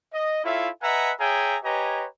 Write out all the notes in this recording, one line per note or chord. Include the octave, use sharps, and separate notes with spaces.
D#5
E4 F4 A4 C#5 E5 F5
B4 D#5 E5 F#5 G#5 A#5
G#4 C#5 E5 G5 G#5 A#5
G4 B4 C#5 D#5 G#5 A#5